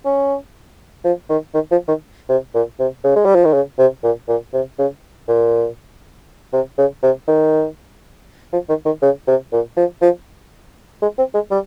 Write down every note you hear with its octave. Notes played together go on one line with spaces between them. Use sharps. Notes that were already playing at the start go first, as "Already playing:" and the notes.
C#4
F3
D#3
D#3
F3
D#3
C3
A#2
C3
C#3
G#3
G3
F3
D#3
C#3
C3
A#2
A#2
C3
C#3
A#2
C3
C#3
C3
D#3
F3
D#3
D#3
C#3
C3
A#2
F3
F3
G#3
C4
G#3
G3